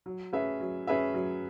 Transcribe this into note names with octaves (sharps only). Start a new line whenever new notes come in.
F#3
C#4 G#4 B4 E5
F#3
C#4 G#4 B4 E5
F#3